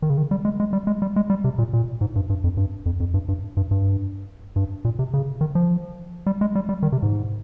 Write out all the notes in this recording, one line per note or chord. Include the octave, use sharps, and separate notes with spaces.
D#3
C#3
D#3
G3
G#3
G#3
G3
G#3
G3
G#3
G3
C3
A#2
A#2
G#2
G2
G2
F2
G2
F2
F2
G2
G2
G2
G2
G2
A#2
C3
C#3
D#3
F3
G3
G#3
G3
G3
D#3
C3
G#2